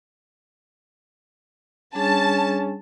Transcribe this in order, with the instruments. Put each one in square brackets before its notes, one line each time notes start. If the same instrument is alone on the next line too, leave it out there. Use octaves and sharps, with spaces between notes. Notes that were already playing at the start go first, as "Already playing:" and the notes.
[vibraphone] G3 D4 G#4 [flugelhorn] C#4 [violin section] A5